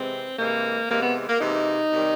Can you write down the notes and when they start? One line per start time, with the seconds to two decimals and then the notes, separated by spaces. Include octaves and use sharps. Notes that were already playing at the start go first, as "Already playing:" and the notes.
Already playing: C3 E3 G#3 C4
0.39 C3 E3 G#3 A#3
0.89 C3 E3 G#3 A#3
1.02 B3
1.28 A#3
1.41 C3 E3 G#3 D#4
1.91 C3 D#3 G3